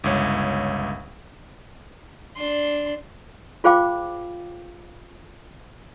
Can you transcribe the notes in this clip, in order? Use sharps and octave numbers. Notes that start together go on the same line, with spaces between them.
G1 C#2 C#5
D4 C6
F4 G#4 C5 F5 G5 D6